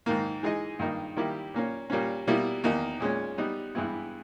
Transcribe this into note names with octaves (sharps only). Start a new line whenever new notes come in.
G#2 D#3 A#3
E3 G#3 D#4 G#4 D#5
G2 D#3 A#3 D#4
D#3 G3 A#3 E4 G4
A#2 A#3 C#4
A#2 G3 A#3 C#4
B2 G3 A#3 E4
E2 D#3 A#3 D#4
A#2 G#3 C#4
G3 B3 D#4
G2 E3 G#3 B3 E4